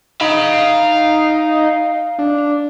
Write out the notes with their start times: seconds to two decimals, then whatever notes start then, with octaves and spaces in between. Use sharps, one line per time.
0.21 D#4 F5 B5
2.19 D4